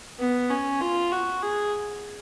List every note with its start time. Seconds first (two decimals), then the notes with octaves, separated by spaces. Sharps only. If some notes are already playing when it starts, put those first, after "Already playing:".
0.19 B3
0.50 C#4
0.81 F4
1.12 F#4
1.42 G#4